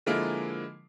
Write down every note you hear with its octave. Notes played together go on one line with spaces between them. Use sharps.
D3 F3 G#3 A#3 E4